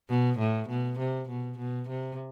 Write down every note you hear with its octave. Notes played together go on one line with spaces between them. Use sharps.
B2
A2
B2
C3
B2
B2
C3